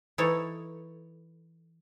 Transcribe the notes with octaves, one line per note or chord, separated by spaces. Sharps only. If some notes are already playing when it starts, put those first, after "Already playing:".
E3 D#4 A4 C#5